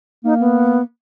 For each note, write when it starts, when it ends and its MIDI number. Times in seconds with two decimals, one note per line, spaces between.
0.25 0.82 58
0.25 0.34 63
0.40 0.81 59